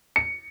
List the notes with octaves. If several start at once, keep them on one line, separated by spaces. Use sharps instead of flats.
C#7